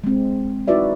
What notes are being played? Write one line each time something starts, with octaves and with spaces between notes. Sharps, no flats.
G#3 C4
D#4 E4 F#4 B4 D5 E5